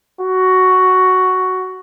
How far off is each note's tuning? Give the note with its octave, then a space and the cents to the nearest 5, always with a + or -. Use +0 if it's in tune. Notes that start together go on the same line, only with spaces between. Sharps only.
F#4 +5